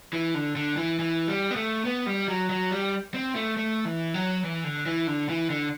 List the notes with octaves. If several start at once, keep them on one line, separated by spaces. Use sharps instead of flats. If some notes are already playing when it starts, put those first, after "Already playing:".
E3
D3
D3
E3
E3
G3
B3
A3
B3
G3
F#3
F#3
G3
C4
A3
A3
E3
F#3
E3
D3
E3
D3
E3
D3